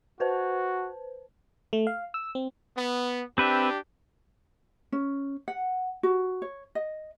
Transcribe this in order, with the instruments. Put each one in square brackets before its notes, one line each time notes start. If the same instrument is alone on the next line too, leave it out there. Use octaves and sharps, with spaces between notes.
[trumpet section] F#4 [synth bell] B4 C5 A5
[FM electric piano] A3
F5
E6
C4
[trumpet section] B3
[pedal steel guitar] C4 B4 E5 [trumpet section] D4 G4
[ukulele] C#4
F#5
F#4
C#5
D#5